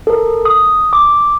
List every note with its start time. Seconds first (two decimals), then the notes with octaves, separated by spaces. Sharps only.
0.07 A4 A#4
0.45 D#6
0.93 D6